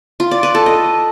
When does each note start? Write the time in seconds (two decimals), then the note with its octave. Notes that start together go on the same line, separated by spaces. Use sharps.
0.20 F4
0.31 D5
0.43 B4
0.55 A4
0.66 D#5